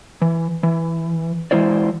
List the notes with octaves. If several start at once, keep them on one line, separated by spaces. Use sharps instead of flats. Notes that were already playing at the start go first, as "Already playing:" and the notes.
E3
E3
E3 G#3 E4 C5 D5